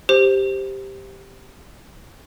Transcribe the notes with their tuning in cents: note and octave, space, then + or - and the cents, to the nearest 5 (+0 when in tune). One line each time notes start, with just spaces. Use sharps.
G4 +0 C5 +0